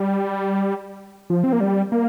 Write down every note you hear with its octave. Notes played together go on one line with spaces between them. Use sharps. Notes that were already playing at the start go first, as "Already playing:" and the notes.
Already playing: G3
F3
C4
A#3
G3
A#3